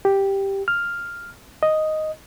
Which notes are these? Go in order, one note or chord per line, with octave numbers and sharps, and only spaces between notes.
G4
F6
D#5